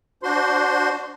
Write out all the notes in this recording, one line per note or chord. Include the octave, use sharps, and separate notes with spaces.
D4 F#4 C5 C6